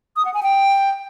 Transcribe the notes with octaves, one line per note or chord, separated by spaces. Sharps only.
D#6
F#5
G#5
G5